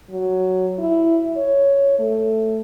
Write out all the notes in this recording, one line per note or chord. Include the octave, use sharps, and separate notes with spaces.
F#3
E4
C#5
A3